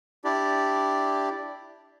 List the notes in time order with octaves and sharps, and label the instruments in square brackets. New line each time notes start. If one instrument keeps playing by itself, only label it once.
[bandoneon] D4 E4 G4 D5